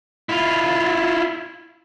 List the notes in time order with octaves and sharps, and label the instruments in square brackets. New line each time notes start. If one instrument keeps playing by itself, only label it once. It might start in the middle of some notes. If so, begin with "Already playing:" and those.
[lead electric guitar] E4 F4